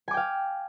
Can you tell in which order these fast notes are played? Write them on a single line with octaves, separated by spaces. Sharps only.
G#5 D6 G5 F5